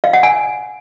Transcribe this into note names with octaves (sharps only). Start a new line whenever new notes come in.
F5
F#5
G#5